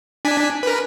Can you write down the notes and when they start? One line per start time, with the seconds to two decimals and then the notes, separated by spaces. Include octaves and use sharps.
0.25 D4 G#5 B6
0.63 A#4 B4